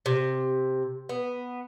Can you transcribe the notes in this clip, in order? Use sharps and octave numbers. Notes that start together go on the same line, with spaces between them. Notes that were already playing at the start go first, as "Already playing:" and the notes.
C3
B3